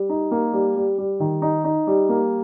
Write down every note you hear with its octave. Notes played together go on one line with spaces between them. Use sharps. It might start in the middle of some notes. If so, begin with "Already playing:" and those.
Already playing: G3
D#4
A#3
G3
G3
G3
D#3
D#4
D#4
G3
A#3